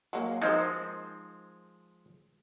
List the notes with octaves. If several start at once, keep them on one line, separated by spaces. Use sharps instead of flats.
F#3 G#3 A#3
F3 G#3 C4 D#4 A#4 C5